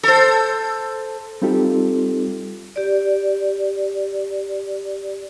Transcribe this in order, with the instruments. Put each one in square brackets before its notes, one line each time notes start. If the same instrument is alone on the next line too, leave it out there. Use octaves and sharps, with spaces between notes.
[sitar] A4 C5
[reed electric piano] G3 C4 D#4 F4 G4 A4
[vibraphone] G4 D5